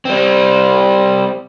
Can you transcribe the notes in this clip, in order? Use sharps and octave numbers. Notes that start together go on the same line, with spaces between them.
G3 C4